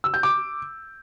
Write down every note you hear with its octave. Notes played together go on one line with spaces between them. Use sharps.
E6
G6
D6